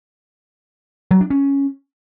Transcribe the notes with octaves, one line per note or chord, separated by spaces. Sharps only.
F#3
D4
C#4